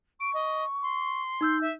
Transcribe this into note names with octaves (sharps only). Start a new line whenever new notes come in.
C#6 D7
D#5
C6
D#4 E6 G6
E5